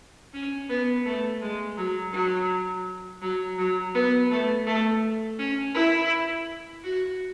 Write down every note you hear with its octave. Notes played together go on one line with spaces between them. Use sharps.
C#4
B3
A3
G#3
F#3
F#3
F#3
F#3
B3
A3
A3
C#4
E4
F#4